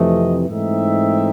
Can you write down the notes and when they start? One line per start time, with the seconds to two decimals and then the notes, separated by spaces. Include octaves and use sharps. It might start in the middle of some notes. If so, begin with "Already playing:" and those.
Already playing: F2 C3 E3 A3 D#5
0.48 G#2 E3 A3 C4 D#4 E5